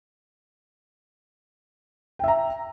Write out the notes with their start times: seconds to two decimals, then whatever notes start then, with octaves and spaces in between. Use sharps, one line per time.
2.19 G5
2.24 E5
2.28 A#5